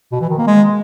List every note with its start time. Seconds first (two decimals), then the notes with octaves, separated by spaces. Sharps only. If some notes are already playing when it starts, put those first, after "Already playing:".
0.12 B2
0.21 E3
0.30 D#3
0.38 A#3
0.47 G#3